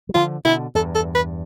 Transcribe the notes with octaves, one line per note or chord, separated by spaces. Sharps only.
G3
D3 F3 F4
B2 D3 E4
E2 G2 A4
A4
B4